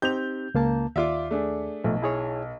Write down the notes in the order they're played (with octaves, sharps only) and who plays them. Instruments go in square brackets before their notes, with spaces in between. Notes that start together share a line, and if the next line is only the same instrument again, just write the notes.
[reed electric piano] C4 D#4 G4 [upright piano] G6 F7
[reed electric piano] C#2 A#3 A5
[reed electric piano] D#2 D6 [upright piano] F4 D5 E5
[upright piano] A3 D4 G#4
[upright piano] B1 [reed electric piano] F3 A3
[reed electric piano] E4 G#4 C#5